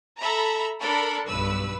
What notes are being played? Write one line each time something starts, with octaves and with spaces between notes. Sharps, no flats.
A4 E5 A#5 B5
D4 A4 A#4 B5
B1 G2 B4 E6